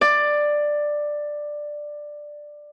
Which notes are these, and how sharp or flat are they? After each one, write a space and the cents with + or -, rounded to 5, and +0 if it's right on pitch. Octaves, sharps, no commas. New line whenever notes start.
D5 +10